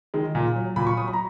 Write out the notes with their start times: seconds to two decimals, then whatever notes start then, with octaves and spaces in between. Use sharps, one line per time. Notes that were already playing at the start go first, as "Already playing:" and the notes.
0.14 D#3 G#3
0.35 A#2
0.56 F#3
0.76 A#2 B5
0.87 C#6
0.97 F#3 D#6
1.08 B5
1.13 A#5